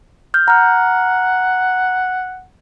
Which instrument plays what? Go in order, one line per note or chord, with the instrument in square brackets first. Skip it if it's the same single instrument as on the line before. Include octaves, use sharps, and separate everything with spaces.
[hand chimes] F6 G6
[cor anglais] F#5 [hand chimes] A#5 F6